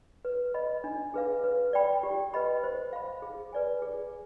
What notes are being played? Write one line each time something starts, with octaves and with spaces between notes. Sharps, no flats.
B4
D#5 B5
D4
G#4 B4 F5
B4
D5 G5 B5
G4
B4 D#5 B5
C5
F5 B5
G#4
B4 D5 G#5
G#4